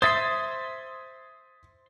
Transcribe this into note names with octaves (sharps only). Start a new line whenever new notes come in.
C5 E5 C6 D#6 G#6 A6